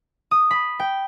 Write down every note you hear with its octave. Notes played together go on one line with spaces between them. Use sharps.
D#6
B5
G5